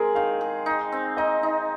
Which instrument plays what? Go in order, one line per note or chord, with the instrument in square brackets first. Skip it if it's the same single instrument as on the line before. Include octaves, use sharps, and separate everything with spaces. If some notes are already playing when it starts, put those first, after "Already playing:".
Already playing: [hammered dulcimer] G#3 C4 [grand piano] G#4 A#4
[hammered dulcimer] D#3 [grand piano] F5
[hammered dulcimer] G#4
D#4
C4
[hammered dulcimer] D#4 [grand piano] D#5
[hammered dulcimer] D#4